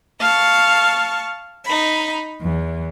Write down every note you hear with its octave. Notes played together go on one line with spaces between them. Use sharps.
F5 A5 C#6
D#4 B5
E2